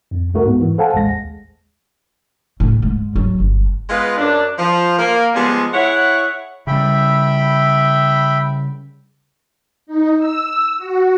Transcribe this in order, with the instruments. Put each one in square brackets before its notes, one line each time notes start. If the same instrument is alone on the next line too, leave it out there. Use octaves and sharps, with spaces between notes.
[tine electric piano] F2
C2 A3 F#4 A#4
G#2 B3
E3
A4 C5 F5 F#5 G#5 A5
A1 D#2 G#3 A#6
[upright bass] A2
G#2
F#3
G1
[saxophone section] G#3 B3 F4 B4
F#2 D4
F3
A#3
F3 G3 G#3 B3 G#4
E4 G#4 C#5 E5 F#5
[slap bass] C#3 G3 [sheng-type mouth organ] E5 G5 B5
[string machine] D#4
E6
F#4